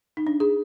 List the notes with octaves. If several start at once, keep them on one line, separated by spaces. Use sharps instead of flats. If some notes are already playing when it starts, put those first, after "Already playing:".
D#4
D4
G#4